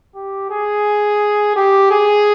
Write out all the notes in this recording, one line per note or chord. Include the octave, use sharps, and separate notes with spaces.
G4
G#4
G4
G#4